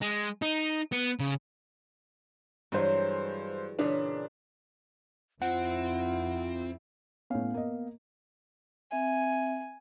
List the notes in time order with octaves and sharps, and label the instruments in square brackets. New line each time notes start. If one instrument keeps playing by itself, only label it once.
[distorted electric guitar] G#3
D#4
B3
C#3
[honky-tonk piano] G2 C5 [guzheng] E3 F#3 G#3
[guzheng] A#2 C#3 E3 [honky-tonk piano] D4
[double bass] F2 E4 [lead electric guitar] C4 [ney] F4 [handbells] F#5
[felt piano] A2 C#4 [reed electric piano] B3 F5
[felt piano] A#3 D#5
[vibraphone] C4 E5 [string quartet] G#5